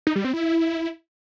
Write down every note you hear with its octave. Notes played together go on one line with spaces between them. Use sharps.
D#4
G3
C4
E4